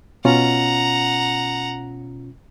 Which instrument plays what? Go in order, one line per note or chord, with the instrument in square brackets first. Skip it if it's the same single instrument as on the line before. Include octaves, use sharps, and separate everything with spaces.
[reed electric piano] B2 C#4 F4 [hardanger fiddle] F#5 A#5